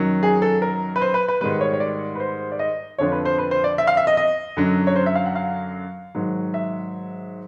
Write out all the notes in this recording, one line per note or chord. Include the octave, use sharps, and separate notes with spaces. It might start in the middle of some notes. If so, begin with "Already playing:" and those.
Already playing: F#2 D#3 F#3
G#4
A4
A#4
B4
C5
B4
B4
G#2 D#3 G3 B4
C#5
C#5
D5
B4
C5
D5
D#5
F2 D3 F3 C#5
B4
C5
B4
C5
D5
E5
F5
E5
D#5
D#5
F#2 D3 F#3
C#5
C5
E5
F5
F#5
F5
G#2 D#3 F#3
E5